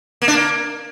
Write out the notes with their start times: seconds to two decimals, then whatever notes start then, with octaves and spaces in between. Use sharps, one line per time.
0.22 A#3
0.28 D4
0.34 A#3